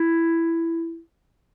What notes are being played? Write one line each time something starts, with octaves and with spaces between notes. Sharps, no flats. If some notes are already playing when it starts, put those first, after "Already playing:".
Already playing: E4